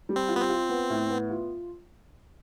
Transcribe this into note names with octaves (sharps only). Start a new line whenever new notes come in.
G3
C4
F4
B3
C4
F4
B3
A2
B3
F4